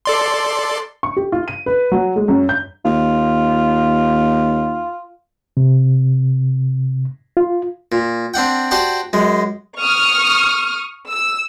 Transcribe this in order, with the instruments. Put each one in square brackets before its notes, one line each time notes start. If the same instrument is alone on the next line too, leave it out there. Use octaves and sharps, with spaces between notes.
[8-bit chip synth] A4 D5 C6
[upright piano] C#6
G4
F4
D#7
B4
F#3
G#3
F#2
G6
[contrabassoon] D#2 [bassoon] F4
[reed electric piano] C3
F4
[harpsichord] A#2
C4 D4 F#5 G5
F#4 G4 C5 D5 G5 A5
F#2 G#3
[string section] C#6 D#6 F6
E6